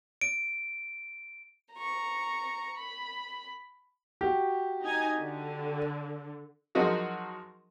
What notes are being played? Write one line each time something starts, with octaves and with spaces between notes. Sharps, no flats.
D7
A#5 C#6
B5
F#4 G4
D#4 G#5
D3
F3 F#3 G#3 D#4 F#4 A#4